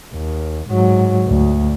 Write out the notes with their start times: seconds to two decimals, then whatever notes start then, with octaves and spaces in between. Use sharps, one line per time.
0.14 D#2
0.69 G#2 F#3
1.27 D2